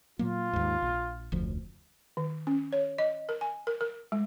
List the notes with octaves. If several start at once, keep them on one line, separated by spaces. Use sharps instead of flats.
A#2 F#3 A#3 F4
D#2 G#2
A#1
F1 D2 F3
D#3
C#4
C#5
D#5
A#4
G#5
A#4
A#4
G#3